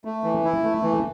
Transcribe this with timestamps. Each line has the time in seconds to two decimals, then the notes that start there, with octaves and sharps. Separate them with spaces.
0.05 A3
0.24 E3
0.45 E4
0.64 A3
0.83 E3